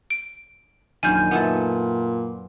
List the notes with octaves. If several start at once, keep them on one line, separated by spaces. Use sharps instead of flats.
D7
A#1 F#2 D#3 G#5 G6
A#2 B3 E4 A4